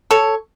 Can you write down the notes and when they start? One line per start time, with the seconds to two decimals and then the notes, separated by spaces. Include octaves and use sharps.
0.11 A4 C#5